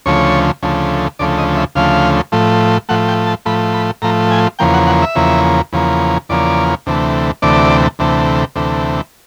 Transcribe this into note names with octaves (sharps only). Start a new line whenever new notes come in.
D2 C#3 F3 A3 C#5
D2 C#3 F3 A3
D2 C#3 F3 A3 D5
D#5
E5
D2 C#3 F3 A3 F5
A2 F3 A3
A2 F3 A3 F#5
G5
A5
A2 F3 A3 B5
B5
A2 F3 A3 A#5
G#5
E2 C#3 F3 A#3 G5
F#5
F#5
E5
E2 C#3 F3 A#3
E2 C#3 F3 A#3
E2 C#3 F3 A#3 D5
D2 C3 E3 A3
D2 C3 E3 A3 D5
D2 C3 E3 A3
D2 C3 E3 A3